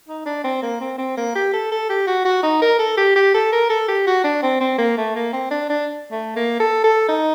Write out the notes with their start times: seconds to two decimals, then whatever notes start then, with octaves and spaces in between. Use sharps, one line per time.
0.08 D#4
0.25 D4
0.44 C4
0.62 A#3
0.81 C4
0.98 C4
1.17 A#3
1.35 G4
1.53 A4
1.71 A4
1.90 G4
2.07 F#4
2.25 F#4
2.43 D#4
2.62 A#4
2.79 A4
2.97 G4
3.16 G4
3.34 A4
3.52 A#4
3.70 A4
3.88 G4
4.07 F#4
4.24 D4
4.42 C4
4.60 C4
4.78 A#3
4.97 A3
5.15 A#3
5.33 C4
5.51 D4
5.70 D4
6.11 A3
6.36 A#3
6.60 A4
6.84 A4
7.08 D#4